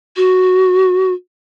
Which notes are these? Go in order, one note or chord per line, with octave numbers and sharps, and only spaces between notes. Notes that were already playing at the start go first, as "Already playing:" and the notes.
F#4